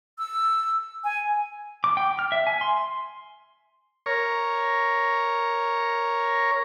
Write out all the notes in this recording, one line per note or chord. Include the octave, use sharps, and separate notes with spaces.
E6
G#5
D6
G5
F6
E5
G#5
C6
A#4 C#5